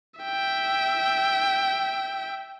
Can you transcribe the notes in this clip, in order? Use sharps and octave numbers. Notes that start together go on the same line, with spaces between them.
E5 G5